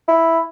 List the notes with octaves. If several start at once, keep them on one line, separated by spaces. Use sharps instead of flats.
E4